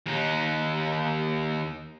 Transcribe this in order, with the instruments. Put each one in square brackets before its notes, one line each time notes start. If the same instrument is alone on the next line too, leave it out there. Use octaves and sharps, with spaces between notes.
[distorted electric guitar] D#2 D#4